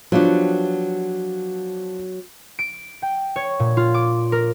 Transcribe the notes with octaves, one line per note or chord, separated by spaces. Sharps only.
F3 F#3 B3 D4 G4
D7
G5
C#5
A#2
F4
D6
A#4